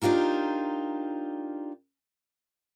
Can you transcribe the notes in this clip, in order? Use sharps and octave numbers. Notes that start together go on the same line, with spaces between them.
D4 D#4 F4 G4 A#4